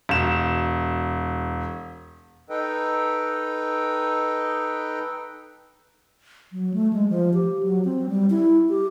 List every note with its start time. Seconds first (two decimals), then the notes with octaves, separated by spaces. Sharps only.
0.09 E1 E7
2.50 D#4 A4 B4 D#5 G5
6.52 F#3
6.74 A3
6.93 G#3
7.09 F3
7.34 G4
7.63 F#3
7.85 C4
8.09 G3
8.30 E4
8.70 G4